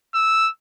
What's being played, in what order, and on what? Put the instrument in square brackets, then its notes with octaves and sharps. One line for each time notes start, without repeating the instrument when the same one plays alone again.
[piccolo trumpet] E6